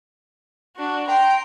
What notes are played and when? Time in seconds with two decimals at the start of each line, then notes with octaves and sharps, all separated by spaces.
0.77 D4 F#4
1.08 G5 A#5 C6